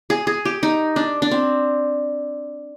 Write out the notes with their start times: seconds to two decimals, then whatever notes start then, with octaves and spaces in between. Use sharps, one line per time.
0.10 G#4
0.27 G#4
0.45 G4
0.63 D#4
0.96 D4
1.22 D4
1.31 C4